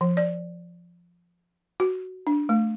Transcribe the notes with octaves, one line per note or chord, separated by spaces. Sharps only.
F3
D5
F#4
D4
A3